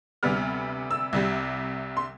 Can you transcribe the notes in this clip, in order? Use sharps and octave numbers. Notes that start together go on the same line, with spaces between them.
D2 C3 G3 B3 F6
E6
C2 C3 G3
C6